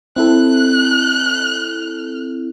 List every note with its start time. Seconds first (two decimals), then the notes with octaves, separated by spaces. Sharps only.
0.16 C4 E4 A4 F#6